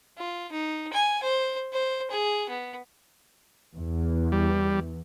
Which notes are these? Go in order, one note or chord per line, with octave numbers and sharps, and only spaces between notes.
F4
D#4
G#5
C5
C5
G#4
B3
E2
G3